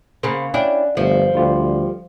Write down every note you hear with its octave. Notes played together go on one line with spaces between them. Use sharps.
C#3 A#3 C5 B5
C#4 D4 E4 G5
G1 F3 A3
D2 G3 F4 G4